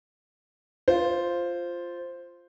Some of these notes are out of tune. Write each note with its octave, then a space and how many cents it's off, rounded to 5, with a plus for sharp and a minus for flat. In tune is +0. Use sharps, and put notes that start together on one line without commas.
F4 -5 C5 +0